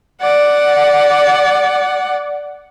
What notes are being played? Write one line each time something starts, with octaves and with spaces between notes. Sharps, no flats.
D5 F#5